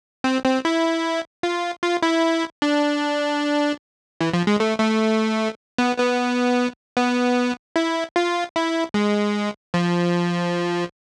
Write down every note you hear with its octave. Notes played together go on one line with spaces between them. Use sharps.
C4
C4
E4
F4
F4
E4
D4
E3
F3
G#3
A3
A3
B3
B3
B3
E4
F4
E4
G#3
F3